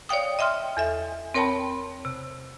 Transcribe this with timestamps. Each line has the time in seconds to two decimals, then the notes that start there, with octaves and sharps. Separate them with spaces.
0.09 C#5 D5 F5 G5 D#6
0.39 D#5 E5 G5 C6 F6
0.77 E2 A4 E5
1.34 C4 A#4 C#5 G5 A5 B5
2.05 C3